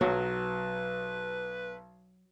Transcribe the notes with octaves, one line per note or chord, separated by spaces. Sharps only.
B1 F#3 B4